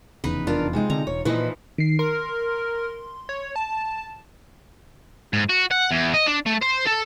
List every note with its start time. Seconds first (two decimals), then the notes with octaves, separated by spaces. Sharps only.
0.24 F1 E2 C#3 D#4 B4
0.47 D4 F4 A#4
0.73 C3 G#3 D#4
0.90 D3 C4 A#5
1.07 E1 C#5
1.25 A#2 E3 F3 D#4 B4 D#5
1.78 D#3 C7
1.99 A#4 C6
3.29 C#5
3.56 A5
5.33 G#2
5.49 F#4
5.71 F#5
5.91 E2
6.14 D#5
6.26 D4
6.46 A3
6.61 C5
6.85 A4